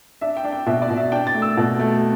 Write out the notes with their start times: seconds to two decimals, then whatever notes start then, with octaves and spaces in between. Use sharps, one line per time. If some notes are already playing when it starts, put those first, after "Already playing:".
0.21 D4 E5
0.37 G5
0.44 D4
0.52 G5
0.66 B2 E5
0.82 D5
0.90 B2
0.97 E5
1.12 D4 G5
1.27 A6
1.34 A3
1.42 E6
1.57 B2
1.79 A3